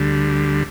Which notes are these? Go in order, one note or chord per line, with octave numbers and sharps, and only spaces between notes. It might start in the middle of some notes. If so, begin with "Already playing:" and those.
Already playing: D2 D3 G3